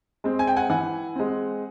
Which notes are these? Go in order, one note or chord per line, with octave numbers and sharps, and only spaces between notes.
G#3 C4
G#5
G5
F#5 G#5
E3 F#5 G#5
G#3 C4